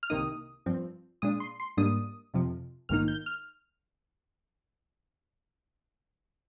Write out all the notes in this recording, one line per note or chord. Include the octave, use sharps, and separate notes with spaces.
F6
C2 C3 D#3 A#3 D#4 D#6
G2 F3 C4
A#2 G#3 D4 D#6
C6
C6
G#2 G3 A#3 D4 D#6
F2 C3 F3
A#1 G#2 D#3 A#3 D#4 F6
G6
F6